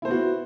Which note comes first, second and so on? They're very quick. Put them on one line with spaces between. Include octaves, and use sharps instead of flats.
E4 C5 B3 F#4